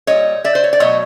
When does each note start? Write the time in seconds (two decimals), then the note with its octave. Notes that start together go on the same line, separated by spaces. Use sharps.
0.07 A#2 G3 C#5 D#5
0.44 D5 E5
0.55 C5
0.64 C#5
0.73 D5
0.80 B2 F#3 A3 C#5 D#5